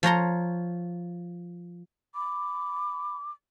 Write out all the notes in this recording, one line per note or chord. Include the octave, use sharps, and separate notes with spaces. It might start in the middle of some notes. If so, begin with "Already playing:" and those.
F3 C#5 A#5 C6
B5 D6